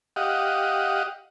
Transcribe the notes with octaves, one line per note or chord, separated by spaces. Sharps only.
G4 D#5 F5 F#5